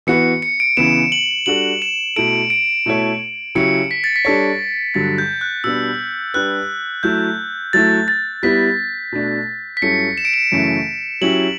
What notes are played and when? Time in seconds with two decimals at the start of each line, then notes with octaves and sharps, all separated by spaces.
0.07 E3 B3 F#4 B4 C#7
0.42 C#7
0.60 D7
0.77 C#3 E3 B3 E7
1.12 F#7
1.46 G3 D4 F#4 A4 F#7
1.82 E7
2.16 B2 A3 E4 A4 D7
2.50 D7
2.86 B2 A3 E4 A4 C#5
3.55 C#3 F#3 C#4 E4 G4 C#7
3.91 B6
4.04 A6
4.16 B6
4.25 G3 D4 A4 C#5
4.94 G2 D3 F#3 A6
5.18 G6
5.41 F#6
5.64 B2 G3 B3 D4 E6
6.34 G3 D4 G4 B4 F#6
7.03 F#3 A3 E4 G6
7.73 F#3 A3 E4 A6
8.08 A6
8.43 G3 B3 E4 B6
9.12 B2 A3 D4
9.77 B6
9.82 G2 F#3 C#4 E4 A4 C#7
10.18 E7
10.25 D7
10.34 E7
10.52 F#2 C#3 E3 A3 C#4
11.21 F#3 C#4 E4 G4 F#7